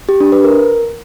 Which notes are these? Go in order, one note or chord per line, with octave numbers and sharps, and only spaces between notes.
G4
D4
B4
A#4